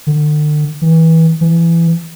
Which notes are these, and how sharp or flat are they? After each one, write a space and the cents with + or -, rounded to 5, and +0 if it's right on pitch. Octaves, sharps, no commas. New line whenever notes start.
D3 +40
E3 -25
E3 +20